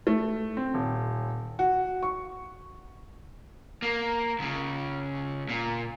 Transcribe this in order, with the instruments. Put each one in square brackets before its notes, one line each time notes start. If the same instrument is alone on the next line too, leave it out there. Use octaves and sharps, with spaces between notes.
[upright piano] A3
C4
D#1
F#4
C#6
[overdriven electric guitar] A#3
C#2 C#3
A#2